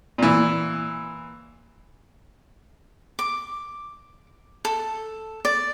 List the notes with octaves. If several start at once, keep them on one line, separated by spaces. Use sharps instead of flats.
A#2 E3
D6
A4
D5